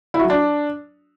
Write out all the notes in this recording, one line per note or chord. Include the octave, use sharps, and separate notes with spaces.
E4
F#4
F#3
D4